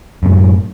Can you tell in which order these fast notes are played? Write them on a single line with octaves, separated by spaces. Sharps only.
F#2 C3 A2